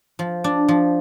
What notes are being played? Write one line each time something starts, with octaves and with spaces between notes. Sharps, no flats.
F3
D4
F3